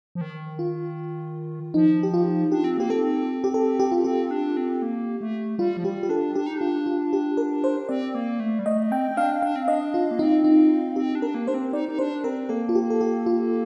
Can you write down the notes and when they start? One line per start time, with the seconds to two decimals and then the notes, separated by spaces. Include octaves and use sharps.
0.15 F3
0.21 D#3
0.59 F4
1.74 F3 D#4
2.03 G4
2.14 F4
2.51 D4 G4
2.64 C4
2.77 A#3 G4
2.90 C4 A4
3.44 G4
3.54 A4
3.80 G4
3.92 F4
4.04 C4 G4
4.31 D4
4.57 C4
4.82 A#3
5.21 A3
5.58 G3 F4
5.77 F3
5.84 G3 G4
6.03 G4
6.09 D4 A4
6.36 D4 G4
6.46 D#4
6.58 D4 F4
6.86 F4
7.13 G4
7.37 A#4
7.64 C5
7.89 C4 D5
8.15 A#3
8.40 A3
8.59 G3
8.66 A3 D#5
8.91 C4 G5
9.11 C4
9.17 D4 F5
9.42 D4 F5
9.56 C4
9.68 D4 D#5
9.94 F4
10.11 A#3
10.19 C4 D#4
10.44 D#4
10.96 C4 G4
11.15 D4
11.22 A#4
11.34 A#3
11.47 D4 C5
11.54 C4
11.73 D#4 D5
11.89 D#4
11.99 D4 C5
12.24 C4 A#4
12.49 A#3 A4
12.69 F4
12.75 G4
12.90 A4
13.01 G4
13.26 F4